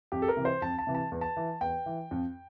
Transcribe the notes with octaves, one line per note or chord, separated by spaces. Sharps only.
F2 G4
A4
A#4
C3 E3
C5
F2 A5
A5
C3 E3
A5
E2
A5
E3
E2 G5
E3
F2